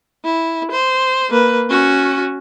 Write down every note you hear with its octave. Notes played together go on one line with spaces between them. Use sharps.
E4
C5
A#3 B4
C#4 F#4